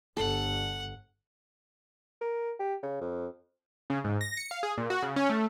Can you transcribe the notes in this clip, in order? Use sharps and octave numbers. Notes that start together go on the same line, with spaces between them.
G1 A4 F#5
A#4
G4
C#3
F2
C#3
G#2
A#6
C#7
F5
G#4
A#2
F#4
C#3
C#4
A3